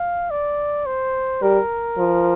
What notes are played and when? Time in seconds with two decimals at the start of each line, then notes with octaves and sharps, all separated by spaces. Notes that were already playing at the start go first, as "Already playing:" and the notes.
Already playing: F5
0.31 D5
0.86 C5
1.42 G3 A#4
1.98 F3